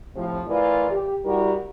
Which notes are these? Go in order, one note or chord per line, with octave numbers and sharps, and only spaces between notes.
A2 C3 F3
E3 A3 F4 A#4 D5
G4
G3 E4 F#4 G4 A#4